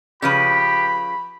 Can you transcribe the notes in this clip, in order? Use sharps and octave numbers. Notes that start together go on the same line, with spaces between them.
C#3 F3 G4 B4 B5